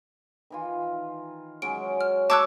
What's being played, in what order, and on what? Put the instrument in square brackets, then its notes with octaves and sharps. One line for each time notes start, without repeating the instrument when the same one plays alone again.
[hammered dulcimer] D#3 E3 F4
[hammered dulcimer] F#3 G#3 C#4 [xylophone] D7
[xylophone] F6
[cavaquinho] C#5 D6 [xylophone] A5 E6 F#6